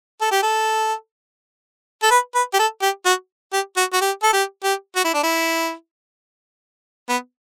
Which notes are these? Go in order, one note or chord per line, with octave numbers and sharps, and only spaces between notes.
A4
G4
A4
A4
B4
B4
G4
A4
G4
F#4
G4
F#4
F#4
G4
A4
G4
G4
F#4
E4
D4
E4
B3